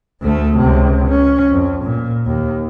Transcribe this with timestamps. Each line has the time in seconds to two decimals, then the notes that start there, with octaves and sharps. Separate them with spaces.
0.22 D2 A3
0.57 C#2 C3
1.09 C#4
1.52 F2
1.84 A#2
2.26 D#2